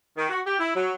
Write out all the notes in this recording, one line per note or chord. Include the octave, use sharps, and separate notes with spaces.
D#3
F#4
G4
E4
F#3